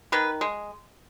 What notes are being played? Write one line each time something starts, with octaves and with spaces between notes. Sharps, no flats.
D#3 B4
G#3